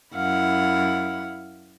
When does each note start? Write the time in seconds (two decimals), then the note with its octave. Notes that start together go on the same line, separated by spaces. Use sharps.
0.15 F#2 E4 F5 F#5 B5